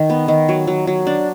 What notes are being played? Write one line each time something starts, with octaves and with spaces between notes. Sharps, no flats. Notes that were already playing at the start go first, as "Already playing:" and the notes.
Already playing: D#3
B3
D#3
F#3
F#3
F#3
D4